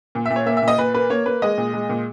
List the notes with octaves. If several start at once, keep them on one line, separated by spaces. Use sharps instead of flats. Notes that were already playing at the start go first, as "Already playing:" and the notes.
A#2
E5
A#2
C#5
A#3 E5
E5
A#2
D#5
A#2 B4
A#3 B4
A#3 C#5
A#3 B4
G#3 D#5
A#2
G#3
A#2